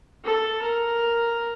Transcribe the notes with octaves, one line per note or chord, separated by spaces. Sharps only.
A4
A#4